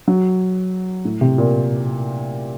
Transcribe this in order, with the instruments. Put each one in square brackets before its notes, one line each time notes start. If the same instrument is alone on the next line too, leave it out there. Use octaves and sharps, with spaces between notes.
[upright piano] F#3
A2
C3
A#2